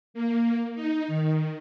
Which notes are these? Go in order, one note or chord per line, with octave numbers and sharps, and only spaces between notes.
A#3
D#4
D#3